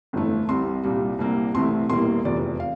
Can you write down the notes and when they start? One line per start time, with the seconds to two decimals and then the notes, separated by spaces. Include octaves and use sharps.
0.13 G1 F2 E3 A3
0.49 C2 C3 G3 C6
0.84 C2 A#2 G3
1.19 C2 C3 G3 A#3
1.54 C2 C3 E3 A3 C6
1.89 E1 E2 E3 G3 A#3 C6
2.25 F1 E2 C3 F3 D5
2.60 F5